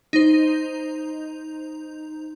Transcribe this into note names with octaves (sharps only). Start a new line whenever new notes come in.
D#4 C5